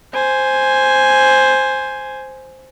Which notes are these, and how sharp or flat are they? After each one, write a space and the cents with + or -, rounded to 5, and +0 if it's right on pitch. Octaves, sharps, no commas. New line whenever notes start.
C5 +0 G#5 +0